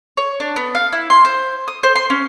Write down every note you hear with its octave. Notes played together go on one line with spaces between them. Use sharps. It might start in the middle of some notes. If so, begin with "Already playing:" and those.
C#5
D4
B3
F5
E4
C6
C5
D#6
C5
C6
C#4